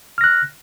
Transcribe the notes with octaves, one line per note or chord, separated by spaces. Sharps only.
F6 F#6 A#6